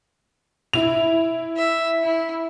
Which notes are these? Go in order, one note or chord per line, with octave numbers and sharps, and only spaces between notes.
E4 F7
E5
E4